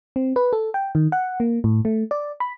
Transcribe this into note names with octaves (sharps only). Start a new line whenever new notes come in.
C4
B4
A4
G5
D#3
F#5
A#3
A2
A3
D5
B5